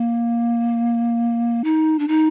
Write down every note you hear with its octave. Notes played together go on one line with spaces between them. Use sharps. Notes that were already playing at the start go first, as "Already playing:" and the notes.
Already playing: A#3
D#4
D4
D#4